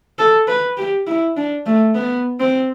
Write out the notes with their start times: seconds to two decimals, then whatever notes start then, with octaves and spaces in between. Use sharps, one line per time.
0.19 A4
0.47 B4
0.77 G4
1.07 E4
1.36 D4
1.66 A3
1.95 B3
2.40 C4